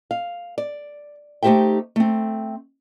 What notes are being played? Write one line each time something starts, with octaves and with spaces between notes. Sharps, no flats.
F5
D5
A3 D#4 G4 C5 E5 G5
A3 C4